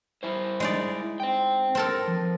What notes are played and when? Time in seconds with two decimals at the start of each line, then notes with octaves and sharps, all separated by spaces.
0.23 E4 C5
0.60 G#3 D#4 D5
1.20 C5 G5
1.75 C4 A4 A#4
2.08 F3